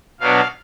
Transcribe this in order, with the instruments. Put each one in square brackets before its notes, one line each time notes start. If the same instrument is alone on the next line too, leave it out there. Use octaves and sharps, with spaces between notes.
[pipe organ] B2 F#3 B3 D4 F5